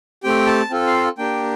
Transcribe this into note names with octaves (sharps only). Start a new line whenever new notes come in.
A3 C4 G4 G5
A5
C4 F4 A4
F5
A#3 D4 G4 G5